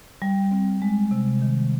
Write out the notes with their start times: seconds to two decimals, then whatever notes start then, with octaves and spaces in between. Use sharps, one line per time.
0.22 G3
0.51 C4
0.82 G#3
1.11 C3
1.42 D#3